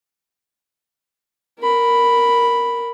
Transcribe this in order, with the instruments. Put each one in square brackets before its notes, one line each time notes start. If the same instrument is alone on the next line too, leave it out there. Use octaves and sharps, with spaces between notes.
[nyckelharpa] A#4 B5